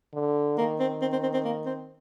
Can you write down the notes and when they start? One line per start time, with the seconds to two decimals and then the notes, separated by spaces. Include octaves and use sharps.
0.14 D3
0.58 D#3 A#3
0.80 C4
1.01 C4
1.12 C4
1.23 C4
1.33 C4
1.45 A#3
1.66 C4